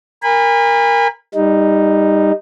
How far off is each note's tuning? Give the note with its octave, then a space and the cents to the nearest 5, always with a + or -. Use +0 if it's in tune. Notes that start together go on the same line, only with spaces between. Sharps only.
A#4 +0 G#5 -35 B5 +0
G3 +20 D#4 +0